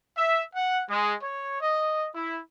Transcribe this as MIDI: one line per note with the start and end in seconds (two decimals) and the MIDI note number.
0.18 0.43 76
0.56 0.82 78
0.90 1.15 56
1.22 1.61 73
1.61 2.09 75
2.15 2.39 64